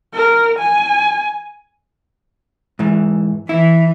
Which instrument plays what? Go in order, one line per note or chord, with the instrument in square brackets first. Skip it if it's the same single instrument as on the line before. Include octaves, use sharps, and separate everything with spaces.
[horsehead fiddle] A#4
G#5
[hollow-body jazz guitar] G#2 E3
[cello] E3 [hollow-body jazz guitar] E4